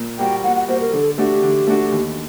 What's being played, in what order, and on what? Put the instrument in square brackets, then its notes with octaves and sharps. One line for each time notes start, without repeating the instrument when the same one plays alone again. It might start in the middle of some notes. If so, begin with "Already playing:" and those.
Already playing: [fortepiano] A#2
[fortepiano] G3 A#3 F#4 [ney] G5
[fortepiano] A#2 [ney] F#5
[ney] F#5
[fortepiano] G3 A#3 F#4 [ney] C5
[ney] A#4
[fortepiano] D3 [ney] A4
[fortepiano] A3 D4 F#4 [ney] G4
[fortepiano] D3
A3 D4 F#4
D#2